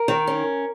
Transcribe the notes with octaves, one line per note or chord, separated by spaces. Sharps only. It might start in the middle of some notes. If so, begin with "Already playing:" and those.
Already playing: A#4
D#3
C#4